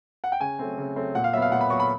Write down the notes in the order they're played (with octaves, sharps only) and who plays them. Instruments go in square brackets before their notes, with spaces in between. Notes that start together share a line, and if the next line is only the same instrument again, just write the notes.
[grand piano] F#5
G5
C#3 G#5
F#3 A3 C4
C#3
F#3 A3 C4
A#2 F#5
F5
F#3 E5
B3
F5
A#2 F#5
B5
F#3 B3 C#6
B5